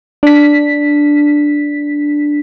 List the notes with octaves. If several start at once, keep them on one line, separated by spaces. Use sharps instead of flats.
D4 B6